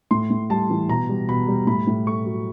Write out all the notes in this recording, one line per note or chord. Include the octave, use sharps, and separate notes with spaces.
A2 C6
A2
G3 A5
E3
B2 A#5
G3
B2 B5
G3
A2 B5
A2
A3 C#6
F#3